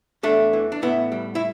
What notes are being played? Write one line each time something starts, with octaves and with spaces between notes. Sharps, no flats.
E2 A3 D4
E3
D4
A2 B3 E4
G3
E4